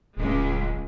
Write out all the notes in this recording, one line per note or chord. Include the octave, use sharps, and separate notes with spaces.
D1 C#2 G#3